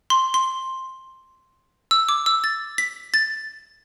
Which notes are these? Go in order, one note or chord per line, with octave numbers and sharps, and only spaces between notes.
C6
C6
E6
D6
E6
A6
B6
A6